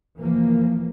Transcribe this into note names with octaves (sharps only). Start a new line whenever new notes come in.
F1 E3 F3 A#3